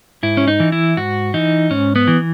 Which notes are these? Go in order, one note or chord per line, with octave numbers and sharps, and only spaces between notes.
G#2 E4
C#4
D#4
E3
E4
G#2 F#4
E3 D#4
G#2 C#4
B3
E3